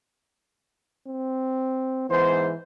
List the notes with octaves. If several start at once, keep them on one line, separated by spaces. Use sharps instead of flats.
C4
G#2 E3 B3 C5